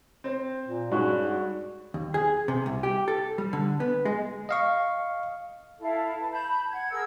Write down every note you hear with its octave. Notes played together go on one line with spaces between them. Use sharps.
C4 C5
A#2
G2 G#3 C#4 D#4 F#4 D5 C#6
D#2
G#4
C3
C2
G4
A4
G3
D3
B3
G#3
D#5 F5 C#6
E4 A4 F5
B4 A5
A5 B5 G6
F#5 G#6
G#4 A#4 E6 G#6